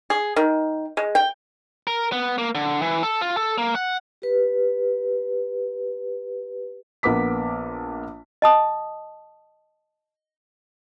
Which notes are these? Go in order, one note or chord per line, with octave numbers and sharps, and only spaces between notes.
G#4
D#3
G#3
G5
A#4
B3
A#3
D3
E3
A4
F4
A4
A#3
F#5
G4 B4
A#1 A#3 B3 D6 B6
D#5 A5 D#6